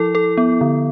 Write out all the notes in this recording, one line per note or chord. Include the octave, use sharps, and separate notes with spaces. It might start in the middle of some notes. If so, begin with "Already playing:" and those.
Already playing: F3 E4 A4
A4
B3
D3